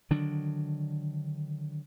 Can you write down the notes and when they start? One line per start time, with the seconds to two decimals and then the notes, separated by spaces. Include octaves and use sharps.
0.10 D3 D#3 F#3 D4